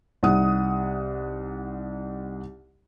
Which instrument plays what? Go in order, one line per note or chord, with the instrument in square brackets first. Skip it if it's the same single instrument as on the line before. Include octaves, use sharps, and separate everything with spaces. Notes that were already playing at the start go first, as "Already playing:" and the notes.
[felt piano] C2 D#4 F#5 D#6